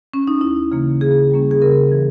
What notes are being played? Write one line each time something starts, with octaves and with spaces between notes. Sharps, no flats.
C#4
D#4
D#2 E4
C#3 E3 A#3
C#3 G#4
G3 A#3 C#4
G#4
C#3 A#4
E3